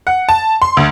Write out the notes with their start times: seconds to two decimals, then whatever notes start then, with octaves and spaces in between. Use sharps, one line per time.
0.07 F#5
0.29 A5
0.62 C6
0.77 D2